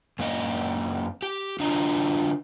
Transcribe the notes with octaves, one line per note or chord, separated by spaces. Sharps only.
F#2 A#3 C#4 D#5
G4
D3 F#3 D4 F4 D#5 A#5